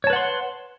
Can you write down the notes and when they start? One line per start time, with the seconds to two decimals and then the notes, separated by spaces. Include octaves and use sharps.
0.04 C#5
0.07 A5
0.10 B4
0.13 F#5
0.16 C6